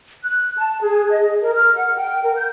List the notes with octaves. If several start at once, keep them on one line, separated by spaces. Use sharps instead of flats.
F#6
A5
G#4
D#5
A#4
F6
F#5
G5
A#4
G6